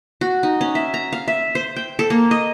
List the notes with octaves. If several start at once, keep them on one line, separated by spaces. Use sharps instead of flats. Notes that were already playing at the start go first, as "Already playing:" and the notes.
F#4
D#4
C#4
E5
A#5
F5
E5
C5
G5
A4
A#3
D#5